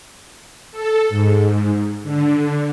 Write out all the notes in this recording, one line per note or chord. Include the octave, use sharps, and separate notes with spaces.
A4
G#2
D3